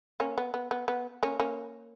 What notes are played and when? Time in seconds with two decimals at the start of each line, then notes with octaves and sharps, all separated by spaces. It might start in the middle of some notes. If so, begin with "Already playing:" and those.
0.20 A#3 C#4
0.38 B3
0.54 B3
0.71 B3
0.88 B3
1.23 A#3 C#4
1.40 A#3 C#4